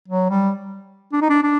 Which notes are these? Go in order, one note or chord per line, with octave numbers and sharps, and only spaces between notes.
F#3
G3
D4
D#4
D4
D4